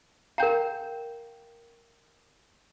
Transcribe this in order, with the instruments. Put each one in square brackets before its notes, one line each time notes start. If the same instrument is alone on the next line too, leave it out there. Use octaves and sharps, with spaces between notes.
[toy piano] A#4 G5 A#5 [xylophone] F5 G6